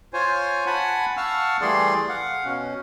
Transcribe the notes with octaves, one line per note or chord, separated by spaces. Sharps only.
F4 C5 C#5 G#5
F#5 G#5 A5 B5
F5 F#5 A5 C#6 E6 F6
E3 G3 A3 G#4 D5 C6
F5 F#5
B2 C#4